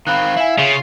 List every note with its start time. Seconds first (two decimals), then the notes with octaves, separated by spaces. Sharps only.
0.07 D#3 C4 F5 B5 F#6
0.37 E4 E5 G#5
0.59 C#3 F4